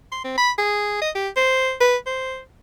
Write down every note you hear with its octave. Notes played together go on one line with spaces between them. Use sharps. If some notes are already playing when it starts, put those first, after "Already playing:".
C6
C4
B5
G#4
D#5
G4
C5
B4
C5